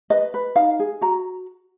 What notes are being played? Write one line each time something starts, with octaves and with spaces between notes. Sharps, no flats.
B4 D#5
B4
D#4 F5
G#4
F#4 A#5